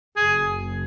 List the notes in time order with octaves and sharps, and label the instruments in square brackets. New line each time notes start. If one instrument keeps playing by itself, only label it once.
[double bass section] F#1 [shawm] G#4